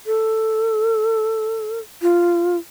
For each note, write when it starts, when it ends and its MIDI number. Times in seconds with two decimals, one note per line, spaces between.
0.06 1.79 69
2.02 2.57 65